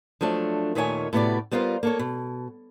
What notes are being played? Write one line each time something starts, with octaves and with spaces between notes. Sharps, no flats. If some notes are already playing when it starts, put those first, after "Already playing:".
F3 F#3 A3 D4
D#2 A#2 D#3 A3 C#5 G#5
A2 C3 B3 F#4 G4 D5
G3 B3 F4 A#4 C5
A#3 A4 C#5
B2